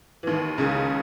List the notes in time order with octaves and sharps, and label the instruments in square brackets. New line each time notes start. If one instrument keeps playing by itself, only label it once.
[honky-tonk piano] E3
D#2 D#3
C#2 C#3